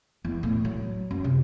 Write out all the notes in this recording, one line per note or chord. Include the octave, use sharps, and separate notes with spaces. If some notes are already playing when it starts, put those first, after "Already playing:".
E2
A2
F#3
F#2
C3